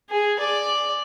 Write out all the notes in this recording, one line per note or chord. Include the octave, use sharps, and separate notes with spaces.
G#4
D5